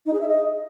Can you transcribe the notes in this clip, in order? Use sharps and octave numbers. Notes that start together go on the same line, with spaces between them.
D#4
G#4
E5
D#5